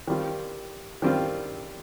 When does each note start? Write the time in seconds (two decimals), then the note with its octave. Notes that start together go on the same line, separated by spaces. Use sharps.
0.07 D#3 G3 C4 F4
1.02 D#3 G3 C4 F4